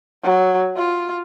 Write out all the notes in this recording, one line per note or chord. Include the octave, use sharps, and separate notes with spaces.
F#3
F4